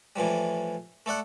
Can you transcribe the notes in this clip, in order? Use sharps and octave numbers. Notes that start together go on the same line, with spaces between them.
A2 E3 F3 G3
A3 A4 D5 F#5